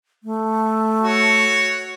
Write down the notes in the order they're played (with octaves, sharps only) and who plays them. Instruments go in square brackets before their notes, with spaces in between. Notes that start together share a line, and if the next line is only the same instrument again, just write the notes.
[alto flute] A3
[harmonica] F#4 C#5